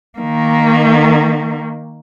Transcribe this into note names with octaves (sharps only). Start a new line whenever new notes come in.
D#3 A#3